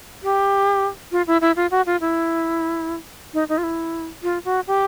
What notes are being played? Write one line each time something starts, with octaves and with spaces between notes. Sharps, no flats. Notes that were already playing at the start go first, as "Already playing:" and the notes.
G4
F4
E4
E4
F4
F#4
F4
E4
D#4
D#4
F4
E4
F4
F#4
G4